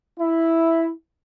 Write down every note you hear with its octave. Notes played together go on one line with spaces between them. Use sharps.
E4